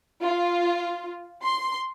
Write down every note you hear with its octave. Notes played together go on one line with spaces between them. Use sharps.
F4
C6